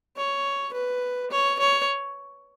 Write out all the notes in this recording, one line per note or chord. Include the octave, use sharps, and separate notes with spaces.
C#5
B4
C#5
C#5